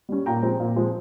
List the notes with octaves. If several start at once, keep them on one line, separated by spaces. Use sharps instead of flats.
G3 C#4
A#2 G5 A#5
F3 G#3 C4
A#2
F3 G#3 C4